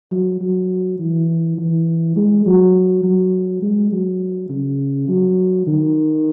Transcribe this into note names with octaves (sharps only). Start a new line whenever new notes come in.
F#3
F#3
E3
E3
G#3
F#3
F#3
G#3
F#3
C#3
F#3
D#3